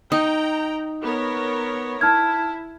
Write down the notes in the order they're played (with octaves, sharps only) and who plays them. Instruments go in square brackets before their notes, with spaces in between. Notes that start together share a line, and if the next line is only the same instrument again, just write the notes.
[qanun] D#4 [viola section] G5 A#5 [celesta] D#6
[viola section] B3 A#4 C#5
[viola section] E4 [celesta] A5 F6 G#6